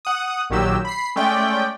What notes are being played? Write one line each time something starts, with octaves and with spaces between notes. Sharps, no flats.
F#5 D#6
A#1 A#2 D#3 F#3 G4 E6
B5 C7
G#3 A3 C#4 D5 G5